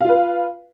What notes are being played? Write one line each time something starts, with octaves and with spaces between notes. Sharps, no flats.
F4 B4 F5